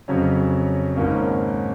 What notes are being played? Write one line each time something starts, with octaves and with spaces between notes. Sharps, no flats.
F2 C#3 F#3 C#4
G#1 G#2 D#3 A#3 C#4